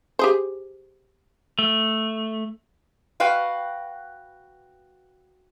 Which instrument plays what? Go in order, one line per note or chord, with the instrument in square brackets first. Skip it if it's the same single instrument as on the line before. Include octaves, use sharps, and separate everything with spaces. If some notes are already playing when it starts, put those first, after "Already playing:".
[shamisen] G4 G#4 C5
[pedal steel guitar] A3
[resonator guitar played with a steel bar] F#4 B4 F5 G5